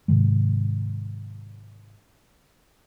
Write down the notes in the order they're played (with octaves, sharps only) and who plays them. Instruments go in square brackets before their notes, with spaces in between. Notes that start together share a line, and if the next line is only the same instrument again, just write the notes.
[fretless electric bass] G#2 C3 D#3 G#3